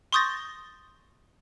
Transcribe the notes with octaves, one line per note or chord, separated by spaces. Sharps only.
C6 C#6 D#6 G6 A6 A#6